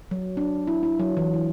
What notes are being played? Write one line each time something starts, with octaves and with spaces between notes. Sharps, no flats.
F#3
D4
E4
E4
F#3
E3
E3